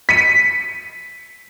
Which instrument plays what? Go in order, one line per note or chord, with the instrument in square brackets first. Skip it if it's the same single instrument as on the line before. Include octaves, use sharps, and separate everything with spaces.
[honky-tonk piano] B6 C#7 D#7